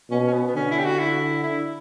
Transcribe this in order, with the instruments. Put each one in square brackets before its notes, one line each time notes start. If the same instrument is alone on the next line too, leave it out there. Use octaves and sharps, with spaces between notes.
[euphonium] B2 [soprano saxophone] C#4
[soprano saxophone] C#4
B3
B3
[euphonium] D3 [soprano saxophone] C#4
[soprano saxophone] E4
G4
F#4
E4
E4